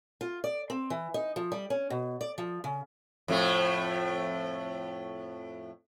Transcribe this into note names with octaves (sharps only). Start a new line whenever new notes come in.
F4
D5
C4
E3
D#4
F3
G3
C#4
B2
D5
F3
C#3
F2 A2 A3